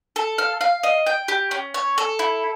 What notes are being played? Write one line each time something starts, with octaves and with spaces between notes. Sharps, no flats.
A4
F5
F5
D#5
G5
G4
C#4
C#5
A4
E4